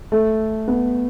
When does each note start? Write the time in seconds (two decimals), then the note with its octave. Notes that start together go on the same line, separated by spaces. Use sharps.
0.12 A3
0.68 B3